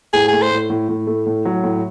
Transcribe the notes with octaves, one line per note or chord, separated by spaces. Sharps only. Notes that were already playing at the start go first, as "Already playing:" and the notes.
A2 G#4
A3 G#4
C5
A2
A2
A2
A3
A2
F#3
A2